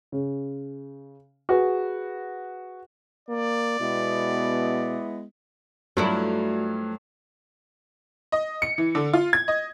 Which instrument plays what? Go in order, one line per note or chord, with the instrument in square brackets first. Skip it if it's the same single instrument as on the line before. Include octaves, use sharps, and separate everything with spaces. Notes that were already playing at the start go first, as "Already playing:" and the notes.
[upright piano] C#3
F#4 G#4 B4
[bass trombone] A#3 [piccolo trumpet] D5
[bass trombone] B2 [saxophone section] G#3 B3 E4
[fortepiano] G2 F#3 [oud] F3 A3 E4 [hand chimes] F#4 D5
[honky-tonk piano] D#5
C#7
E3
D3
F4
G#6
D#5